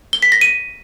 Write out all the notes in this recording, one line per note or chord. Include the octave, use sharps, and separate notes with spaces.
G7
B6
A#6
D#7